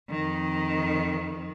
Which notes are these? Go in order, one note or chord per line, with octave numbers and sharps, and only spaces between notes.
F2 D#3